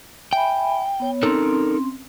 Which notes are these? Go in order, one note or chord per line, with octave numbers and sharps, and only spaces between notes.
E5 G5 G#5 B5
B3 C#5
C4 C#4 D#4 A4 A#4 C6